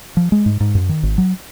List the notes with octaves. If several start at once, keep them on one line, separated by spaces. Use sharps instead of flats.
F3
G#3
G#2
G#2
F#2
D#3
G#1
F#3